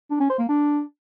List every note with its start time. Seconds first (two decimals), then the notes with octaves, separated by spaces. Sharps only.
0.10 D4
0.20 C#4
0.29 C5
0.39 A#3
0.48 D4